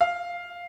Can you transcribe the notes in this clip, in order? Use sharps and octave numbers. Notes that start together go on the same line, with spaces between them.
F5